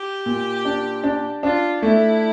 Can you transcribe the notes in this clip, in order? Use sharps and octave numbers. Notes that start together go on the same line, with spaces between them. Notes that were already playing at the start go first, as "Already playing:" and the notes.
Already playing: G4
A#2
D4
D4
D4 F4
A3 E4